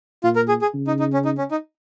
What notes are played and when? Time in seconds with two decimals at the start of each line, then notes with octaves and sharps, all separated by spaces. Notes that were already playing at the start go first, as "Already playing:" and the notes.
0.23 A#2 F4
0.36 A#4
0.48 G#4
0.62 G#4
0.74 C#3
0.87 D#4
1.00 D#4
1.13 C#4
1.25 D#4
1.38 C#4
1.51 D#4